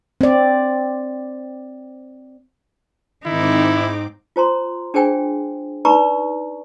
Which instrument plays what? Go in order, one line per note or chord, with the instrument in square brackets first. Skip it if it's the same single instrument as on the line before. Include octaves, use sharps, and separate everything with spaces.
[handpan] C4 D5
[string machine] G#2 C4 D6 [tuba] D#3 [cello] D#4 [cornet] E4
[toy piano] F4 C5 A#5 C6
D4 G#4 C5 G5 G#5
D#4 B4 D5 A#5 B5 C#6